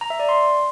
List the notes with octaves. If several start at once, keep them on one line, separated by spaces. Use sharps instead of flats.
A#5
E5
D5
C6